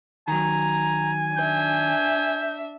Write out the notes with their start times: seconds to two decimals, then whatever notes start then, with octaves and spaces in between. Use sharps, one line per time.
0.28 D#3 F#3 G#5 A#5
1.36 D4 E5 G6